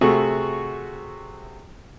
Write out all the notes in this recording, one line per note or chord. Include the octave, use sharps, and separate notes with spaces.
C3 A3 F#4 G#4